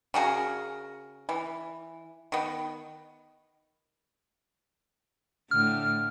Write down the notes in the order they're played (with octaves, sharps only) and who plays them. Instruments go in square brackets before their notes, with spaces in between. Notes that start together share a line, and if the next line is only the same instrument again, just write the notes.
[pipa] C#3 F#4 G#4 A#4
E3
D#3 B3
[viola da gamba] A2 D3 [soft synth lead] F6